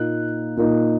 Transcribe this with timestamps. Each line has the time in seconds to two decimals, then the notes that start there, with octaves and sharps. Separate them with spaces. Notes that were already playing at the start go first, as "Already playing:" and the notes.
Already playing: A#2 A#3 D#4 F#6
0.57 A#2 A#3 D#4